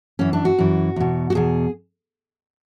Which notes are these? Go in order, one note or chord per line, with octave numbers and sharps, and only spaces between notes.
F#2 E3 C#4
D4
F#4
F#2 E3
E2 B2
F#4
E2 B2 G#4